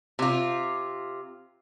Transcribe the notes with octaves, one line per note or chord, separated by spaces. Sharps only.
C3 F4